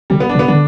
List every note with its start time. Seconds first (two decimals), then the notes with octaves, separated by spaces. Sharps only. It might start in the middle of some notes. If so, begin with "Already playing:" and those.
0.10 C#3 G3
0.20 B3
0.29 D4
0.35 B2
0.39 B3
0.48 D3 D4